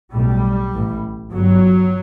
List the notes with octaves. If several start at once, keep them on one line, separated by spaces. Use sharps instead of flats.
B1 A2 G3
A1 A2
G1 G2 F#3